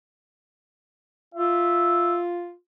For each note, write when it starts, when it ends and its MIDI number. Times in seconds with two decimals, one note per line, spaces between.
1.34 2.53 65
1.34 2.19 76